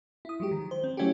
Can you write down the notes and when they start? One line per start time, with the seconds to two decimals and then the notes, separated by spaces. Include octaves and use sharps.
0.25 E4 D#6
0.40 F3 F#3 G#3 G4
0.51 D#3
0.71 C5
0.84 C4
0.97 F#3 A3 C#4 E4 F#4 G4